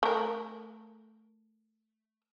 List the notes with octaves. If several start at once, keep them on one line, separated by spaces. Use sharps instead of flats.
A3 A#4